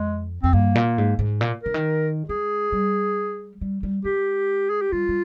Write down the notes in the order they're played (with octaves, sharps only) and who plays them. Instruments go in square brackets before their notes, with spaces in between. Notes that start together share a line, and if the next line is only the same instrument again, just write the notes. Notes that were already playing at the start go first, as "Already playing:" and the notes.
Already playing: [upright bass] F2 [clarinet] G#3
[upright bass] F2 [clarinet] C4
[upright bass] G2 [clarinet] A#3
[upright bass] A#2
G#2
G#2
A#2
[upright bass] D3 [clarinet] A#4
[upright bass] D#3
[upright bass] G#3 [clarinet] G#4
[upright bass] G3
G3
G3
[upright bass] G#3 [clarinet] G4
[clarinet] G#4
G4
[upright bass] G3 [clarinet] F4
[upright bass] G3